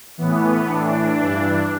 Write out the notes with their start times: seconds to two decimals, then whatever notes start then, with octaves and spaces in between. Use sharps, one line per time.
0.18 A2 E3 B3
0.68 A2 E3 D4
1.18 G2 E3